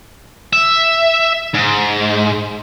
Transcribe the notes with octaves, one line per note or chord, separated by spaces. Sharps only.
E5
G#2